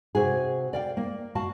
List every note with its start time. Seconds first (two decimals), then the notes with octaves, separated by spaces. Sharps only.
0.15 C3 F#4 G#4
0.73 D5 F5 G5
0.97 A#3
1.35 F#4 F5 A5